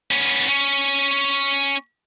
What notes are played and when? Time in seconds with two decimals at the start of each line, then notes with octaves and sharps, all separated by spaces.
0.11 B3 C#4
0.48 C#4